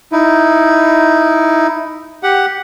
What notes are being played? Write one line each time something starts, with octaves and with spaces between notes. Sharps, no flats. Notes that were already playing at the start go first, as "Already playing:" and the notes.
D#4 E4
G4 F#5